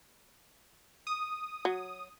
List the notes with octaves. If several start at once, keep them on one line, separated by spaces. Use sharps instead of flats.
D#6
F#3